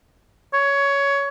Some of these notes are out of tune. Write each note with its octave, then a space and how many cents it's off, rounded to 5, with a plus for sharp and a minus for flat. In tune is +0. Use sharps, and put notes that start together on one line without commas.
C#5 +15